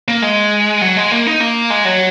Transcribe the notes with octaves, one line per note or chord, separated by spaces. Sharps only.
A#3
G#3
F#3
G#3
A#3
D#4
A#3
G#3
F#3